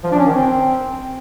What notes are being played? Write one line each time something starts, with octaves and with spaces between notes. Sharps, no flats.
F3
D4
C#4
D#3
C4